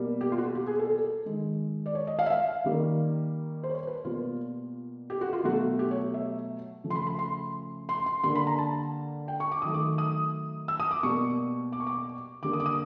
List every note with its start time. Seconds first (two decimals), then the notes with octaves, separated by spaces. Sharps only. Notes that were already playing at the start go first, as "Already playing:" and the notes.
Already playing: B2 G3 A#3
0.21 G4
0.32 F4
0.38 F#4
0.55 G4
0.67 G#4
0.79 A4
0.91 A4
1.26 D#3 G#3
1.86 D5
1.95 C#5
2.07 D#5
2.19 F5
2.26 E5
2.30 F5
2.64 D#3 G3 A#3
3.63 C5
3.70 C#5
3.87 B4
4.04 B2 G3 A#3 F4
5.10 G4
5.21 F#4
5.33 F4
5.44 B2 F#3 A3 F#4
5.79 G4
5.91 C#5
6.14 E5
6.84 C#3 F3 A3
6.90 C6
6.96 B5
7.07 B5
7.19 C6
7.89 C6
8.06 C6
8.23 D3 G3 A#3 C6
8.35 B5
8.47 A#5
8.59 A5
9.28 G5
9.40 C#6
9.51 D6
9.62 D#3 F#3 A3 D#6
9.74 D6
9.98 D#6
10.68 E6
10.80 D#6
10.91 D6
11.03 B2 G3 A#3 C#6
11.72 D6
11.80 C#6
11.87 D6
12.42 D3 G3 A#3 D6
12.53 D#6
12.60 D6
12.66 D#6